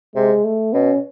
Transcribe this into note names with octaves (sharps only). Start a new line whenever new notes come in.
C3 G#3
A3
B2 C#4